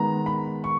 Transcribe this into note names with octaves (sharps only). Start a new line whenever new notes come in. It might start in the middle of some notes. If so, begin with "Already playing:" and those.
Already playing: D#3 G#3 B3 A#5
B5
C#6